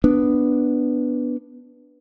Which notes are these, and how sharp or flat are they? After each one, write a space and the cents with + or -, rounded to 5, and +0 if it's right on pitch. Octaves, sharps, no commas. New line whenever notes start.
B3 +0 D4 -5